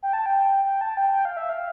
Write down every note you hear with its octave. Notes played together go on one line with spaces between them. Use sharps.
G5
A5
G5
G5
A5
G5
G5
F5
E5
F5